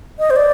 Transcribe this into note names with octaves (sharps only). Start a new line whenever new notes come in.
D#5
C5
D5